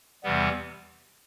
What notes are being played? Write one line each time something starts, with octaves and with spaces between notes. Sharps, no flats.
E2 C3 E3 G3 B3